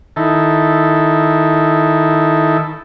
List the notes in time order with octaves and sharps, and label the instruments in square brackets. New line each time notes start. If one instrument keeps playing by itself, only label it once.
[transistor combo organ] D#3 E4 A4